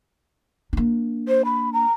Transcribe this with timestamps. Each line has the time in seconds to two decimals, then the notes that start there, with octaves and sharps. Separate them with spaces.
0.73 A#3 D4
1.28 C5
1.45 B5
1.73 A#5